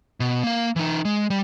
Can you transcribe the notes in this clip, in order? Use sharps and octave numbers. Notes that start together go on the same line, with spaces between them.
B2
A#3 F5
E3 D#4
G#3
G3